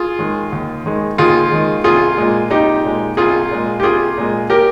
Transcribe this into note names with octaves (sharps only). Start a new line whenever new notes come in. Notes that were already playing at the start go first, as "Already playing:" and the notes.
Already playing: F4 G#4
D#3 G#3
D#2
D#3 G#3
D#2 F4 G#4
D#3 G#3
C2 F4 G#4
A#2 G#3
C2 D#4 G4
A#2 G#3
C2 F4 G#4
A#2 G#3
G4
C2 F4 G#4
A#2 G#3
G4 A#4